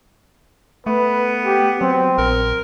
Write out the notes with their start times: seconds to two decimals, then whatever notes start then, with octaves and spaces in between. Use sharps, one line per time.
0.86 A3 B3 B4
1.46 G4
1.81 F#3 C4
2.18 A#1 A#4